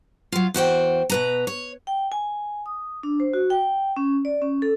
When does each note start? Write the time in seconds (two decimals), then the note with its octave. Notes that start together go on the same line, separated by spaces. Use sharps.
0.32 F#3 F4
0.54 E2 F#4 C5 G5
1.10 B2 B4 A#5
1.47 C#5
1.87 G5
2.12 G#5
2.66 D#6
3.03 D4
3.20 C5
3.34 F#4
3.50 G5
3.97 C#4
4.25 D5
4.42 C#4
4.62 A4